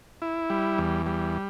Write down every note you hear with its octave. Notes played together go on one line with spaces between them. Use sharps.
E4
G3
E2
G3